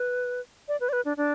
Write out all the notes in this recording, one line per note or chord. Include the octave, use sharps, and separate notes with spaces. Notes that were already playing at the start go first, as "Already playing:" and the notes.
Already playing: B4
D5
B4
D5
B4
D4
D4